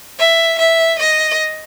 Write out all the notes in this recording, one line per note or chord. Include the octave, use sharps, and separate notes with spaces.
E5
E5
D#5